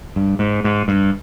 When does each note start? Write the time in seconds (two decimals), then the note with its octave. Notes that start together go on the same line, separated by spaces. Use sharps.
0.16 G2
0.39 G#2
0.64 G#2
0.88 G2